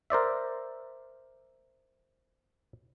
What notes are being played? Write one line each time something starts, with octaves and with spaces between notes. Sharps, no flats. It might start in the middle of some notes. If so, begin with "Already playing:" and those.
A#4 C5 D5 E5